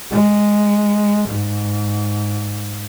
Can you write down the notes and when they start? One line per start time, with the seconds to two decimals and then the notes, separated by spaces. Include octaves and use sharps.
0.11 G#3
1.29 G#2